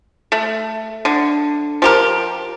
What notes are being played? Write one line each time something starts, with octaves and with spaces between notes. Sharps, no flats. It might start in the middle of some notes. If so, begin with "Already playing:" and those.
A3
D3
F3 G4 A#4